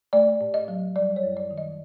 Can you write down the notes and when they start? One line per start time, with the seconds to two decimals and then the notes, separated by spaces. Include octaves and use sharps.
0.13 A3 D5
0.41 A2
0.54 D#5
0.68 F#3
0.96 G3 D5
1.16 C#5
1.23 F#2
1.37 D5
1.51 D#3
1.58 D#5